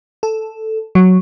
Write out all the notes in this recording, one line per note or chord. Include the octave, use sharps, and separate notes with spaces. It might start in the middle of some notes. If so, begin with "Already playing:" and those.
A4
F#3